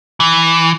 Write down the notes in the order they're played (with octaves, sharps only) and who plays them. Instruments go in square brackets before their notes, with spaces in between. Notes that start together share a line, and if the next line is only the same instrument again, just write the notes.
[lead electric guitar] E3